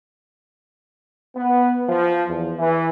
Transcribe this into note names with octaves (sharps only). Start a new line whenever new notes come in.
B3
F3
E2
E3